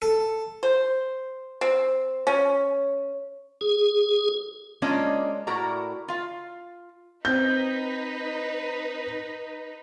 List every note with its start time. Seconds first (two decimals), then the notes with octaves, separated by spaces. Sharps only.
0.02 A4
0.63 C5
1.61 C4
2.27 C#4
3.61 G#4
4.82 G#3 A#3 C#4 D4 F4 D#5
5.47 A2 E4 F#4 A#4 D5 A#5
6.08 F4 F5
7.25 C4 D#4 B4 G6